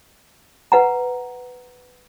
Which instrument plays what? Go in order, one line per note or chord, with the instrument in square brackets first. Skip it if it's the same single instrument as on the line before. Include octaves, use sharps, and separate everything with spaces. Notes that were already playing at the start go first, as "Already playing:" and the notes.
[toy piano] B4 F#5 A#5